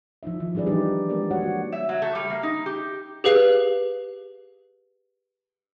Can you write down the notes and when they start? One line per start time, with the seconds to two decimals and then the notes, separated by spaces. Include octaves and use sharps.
0.23 F3 D#4 E4 E5
0.40 D#3 F3
0.55 G3 C#4 G#4 B4 D5
0.66 E3 D4 D#4 G4
1.09 G#3 A#3 G4 A#4 D5
1.31 F#4 C#5 F#5
1.72 E5
1.89 F#3
2.02 A3
2.15 G3
2.30 A#3
2.43 D#4
2.66 G4
3.24 G4 G#4 B4 F5